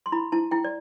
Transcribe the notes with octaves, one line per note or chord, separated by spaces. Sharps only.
C6
E4 B5
E4 A5
E4 G5
D5